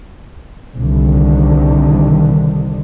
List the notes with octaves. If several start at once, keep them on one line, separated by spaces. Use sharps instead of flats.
C2 D3 D#3